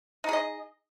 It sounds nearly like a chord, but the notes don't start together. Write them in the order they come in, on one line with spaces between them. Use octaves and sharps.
D#4 G#4 D#5